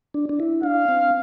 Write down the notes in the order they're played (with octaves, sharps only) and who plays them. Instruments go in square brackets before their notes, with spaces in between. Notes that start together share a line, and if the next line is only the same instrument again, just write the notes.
[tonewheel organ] D4
D4
E4
[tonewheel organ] D4 [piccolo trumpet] F5
[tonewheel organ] C4